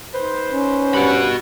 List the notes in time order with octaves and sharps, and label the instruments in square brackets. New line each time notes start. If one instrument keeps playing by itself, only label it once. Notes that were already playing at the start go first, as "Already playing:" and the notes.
[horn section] D#4 B4 C5
[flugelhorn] C#4
[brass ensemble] G2 F#5 [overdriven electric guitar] F#4 B5